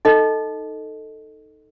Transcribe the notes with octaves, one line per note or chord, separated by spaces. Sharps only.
D#4 A4 D#5